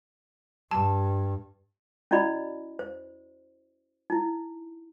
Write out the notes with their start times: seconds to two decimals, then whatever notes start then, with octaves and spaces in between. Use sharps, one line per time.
0.71 G2 A5
2.11 C#4 E4 F#4 D5 D#5 B5
2.79 C5
4.10 D#4 E4